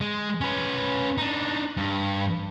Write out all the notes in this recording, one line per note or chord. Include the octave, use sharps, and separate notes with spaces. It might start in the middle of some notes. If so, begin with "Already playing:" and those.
G#3
C#4 B4
D4 D#4
G2